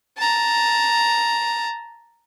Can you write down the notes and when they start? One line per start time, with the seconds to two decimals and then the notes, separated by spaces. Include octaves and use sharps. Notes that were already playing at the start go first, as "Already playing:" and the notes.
0.18 A5 A#5